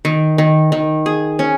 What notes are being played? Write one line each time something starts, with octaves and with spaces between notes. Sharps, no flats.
D#3
D#3
D#3
G#4
C#4